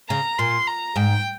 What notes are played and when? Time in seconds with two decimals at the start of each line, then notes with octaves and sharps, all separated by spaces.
0.09 C#3 A#5
0.39 A#2 C6
0.67 A#5
0.96 G#2 G5